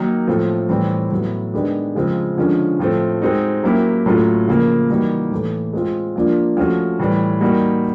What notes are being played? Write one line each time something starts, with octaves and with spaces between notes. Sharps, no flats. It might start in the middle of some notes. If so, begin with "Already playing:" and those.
Already playing: D#3 F#3 A#3 D#4
A2 F3 A3 C4
A2 E3 G3 C4
A2 F#3 B3 E4
D#3 G#3 B3 D4 G4
C#3 F3 G#3 C4
D3 F3 G#3 C#4
A2 F3 A3 C4
G#3 C4 D#4 F#4
F#3 A#3 C#4 E4 G4
A2 F#3 A3 C#4 F4
C#3 F3 A#3
E3 G3 A#3 D#4 F#4
A2 E3 A3
G#3 C4 F4
F3 A#3 D4 F4
F3 A3 C#4 F#4
A2 E3 G3
G3 A#3 D#4 F#4